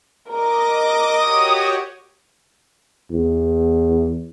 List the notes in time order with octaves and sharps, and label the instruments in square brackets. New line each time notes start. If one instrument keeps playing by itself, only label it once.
[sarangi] A#4 [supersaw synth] D#5 D6 A#6
[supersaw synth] F#4 G4 C#5 [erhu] D#6
[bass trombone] E2